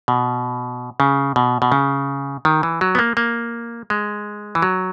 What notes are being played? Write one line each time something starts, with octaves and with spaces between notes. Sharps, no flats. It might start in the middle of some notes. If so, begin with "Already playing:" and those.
B2
C#3
B2
B2
C#3
D#3
E3
F#3
B3
A#3
A#3
G#3
E3
F#3